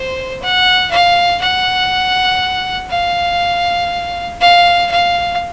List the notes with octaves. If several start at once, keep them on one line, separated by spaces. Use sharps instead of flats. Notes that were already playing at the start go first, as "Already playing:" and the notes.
Already playing: C5
F#5
F5
F#5
F5
F5
F5